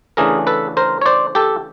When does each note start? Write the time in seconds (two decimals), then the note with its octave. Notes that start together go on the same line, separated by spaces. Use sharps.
0.17 C#3 E3 A3 D4 G#4 A#4
0.47 A4 B4
0.77 A#4 C5
1.01 C#5
1.06 C5 D5
1.35 G4 A4